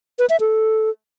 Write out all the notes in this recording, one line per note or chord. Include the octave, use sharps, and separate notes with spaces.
B4
E5
A4